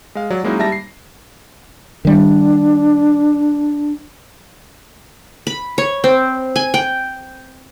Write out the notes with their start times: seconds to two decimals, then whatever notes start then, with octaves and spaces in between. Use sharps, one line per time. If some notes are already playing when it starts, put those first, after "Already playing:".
0.15 G#3 F5
0.30 F#3 D5
0.44 F#3 G#3 A#3 C#4 D#4 E4
0.59 G3 E5 A5 A#6
0.72 C7
2.05 D#3 G3 D4
5.47 B5
5.78 C#5
6.04 C4
6.56 G#5
6.74 G5